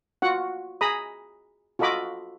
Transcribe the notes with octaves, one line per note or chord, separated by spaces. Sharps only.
F4 F#4 F#5
G#4 A#5 B5 D#6
F4 F#4 A4 D#5 B5 D6